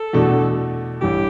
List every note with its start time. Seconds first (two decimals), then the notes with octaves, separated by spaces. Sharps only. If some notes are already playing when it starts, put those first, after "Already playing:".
Already playing: A4
0.13 E2 B2 A3 D4
1.01 A1 G2 E3 G4